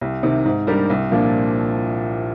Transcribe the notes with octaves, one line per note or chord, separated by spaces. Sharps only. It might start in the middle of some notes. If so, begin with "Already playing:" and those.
C2
C3 D#3
G#2
G3 D4 G4 A#4
C2
A#2 F3 A#3 D4